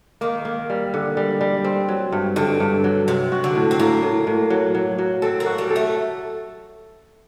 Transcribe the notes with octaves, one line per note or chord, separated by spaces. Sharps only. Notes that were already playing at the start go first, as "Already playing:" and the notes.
D#3 A#3
A#3
G3
D3
G3
G3
C4
F#3
G2
G2 D3
G2
F#3
C3 F#3
F#4
D3
A2
C4
A2 A#3
A2
A2
F#3
F#3
F#3
C4 A4
A#3
F#4
G3
A4
A3